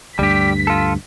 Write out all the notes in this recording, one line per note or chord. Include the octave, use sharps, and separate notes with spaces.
D2 G2 G3 G4 B6
F4 A4